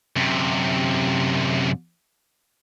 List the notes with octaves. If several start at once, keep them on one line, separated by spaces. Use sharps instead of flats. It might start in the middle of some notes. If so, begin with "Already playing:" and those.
F#2 C3